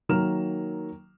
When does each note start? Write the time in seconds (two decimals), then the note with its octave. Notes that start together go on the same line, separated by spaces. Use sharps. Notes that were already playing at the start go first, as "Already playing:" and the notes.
0.09 D#3 F#3 A#3 A#5 F6 E7